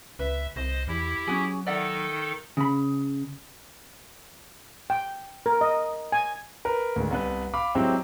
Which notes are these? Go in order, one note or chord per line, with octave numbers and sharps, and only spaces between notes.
C#2 B4 E5
C2 C5 D#5
E2 E4 G4
F#3 C#4 F#4 G#4
D#3 D#4 A4 D5 E5 F#5
C#3 B5
G5
A#4
D#5
G#5
A#4 B4
D2 G#2
C2 B3 B4
F5 B5 D6
F#3 G#3 C4 E4 G4